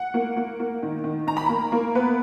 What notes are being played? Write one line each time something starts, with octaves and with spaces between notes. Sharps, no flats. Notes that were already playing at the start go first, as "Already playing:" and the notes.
Already playing: F#5
A#3
A#3
A#3
D#3
D#3
D#3 A#5
B5
A#3 A#5
A#3
B3 B4